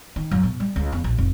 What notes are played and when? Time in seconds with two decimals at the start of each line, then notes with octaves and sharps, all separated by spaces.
0.16 D#3
0.31 F#2
0.43 B2
0.60 G3
0.76 C#2
0.92 E2
1.04 A#1
1.18 F1